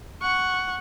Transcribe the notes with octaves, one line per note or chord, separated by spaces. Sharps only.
F#5 C#6